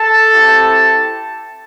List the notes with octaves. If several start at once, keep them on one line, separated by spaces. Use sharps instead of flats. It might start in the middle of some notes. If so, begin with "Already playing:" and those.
Already playing: A4 A5
C4 E4 G4